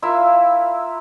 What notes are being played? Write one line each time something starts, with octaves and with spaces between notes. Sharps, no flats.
E4 F4 A#4 E5